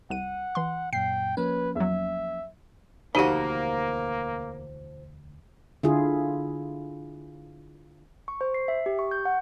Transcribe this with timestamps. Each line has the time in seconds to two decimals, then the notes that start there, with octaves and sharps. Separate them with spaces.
0.10 C2 F#5 D#7
0.55 E3 C6
0.93 F#2 A#2 G5 C7
1.37 F3 A#3 C#4 B4
1.76 E2 F#3 E5
3.15 E1 D2 F3 A#3 D#4 F#4 G4
5.83 D3 E4 F4 G#4
8.28 C#6
8.41 C5
8.54 C7
8.68 E5
8.86 G4
8.99 C#6
9.11 G6
9.25 F#5